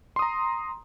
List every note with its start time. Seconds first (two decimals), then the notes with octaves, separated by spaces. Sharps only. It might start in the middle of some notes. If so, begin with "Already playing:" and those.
0.16 C6
0.19 D#6
0.22 A#5